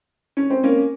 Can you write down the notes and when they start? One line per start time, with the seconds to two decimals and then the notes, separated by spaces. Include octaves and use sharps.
0.37 C#4
0.50 C4
0.63 A#3 C#4